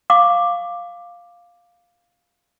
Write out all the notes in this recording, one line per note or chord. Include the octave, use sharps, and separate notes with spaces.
F5 C#6 D6